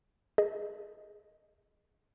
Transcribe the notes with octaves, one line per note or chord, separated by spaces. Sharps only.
G#4 D#5